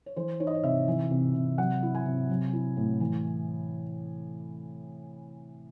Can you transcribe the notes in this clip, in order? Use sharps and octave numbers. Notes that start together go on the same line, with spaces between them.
C#5
E3 C5
D#4 C#5
D#5
C#5
C3 E5
E3
C3
C3
F#3 F#5
E4
G#5
C3
F#3
E4
A2
E3